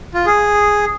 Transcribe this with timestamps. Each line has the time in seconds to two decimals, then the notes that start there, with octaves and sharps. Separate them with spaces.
0.14 F4
0.26 G#4